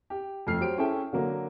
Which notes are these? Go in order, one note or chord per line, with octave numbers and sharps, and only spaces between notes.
G4
F2 A3 F6 C7
F#3 G4 C5 D7
C#4 E4 G#4 A4 E5 G5
D3 F#3 A#3